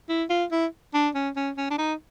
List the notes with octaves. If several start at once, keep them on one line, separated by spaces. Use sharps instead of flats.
E4
F4
E4
D4
C#4
C#4
C#4
D4
D#4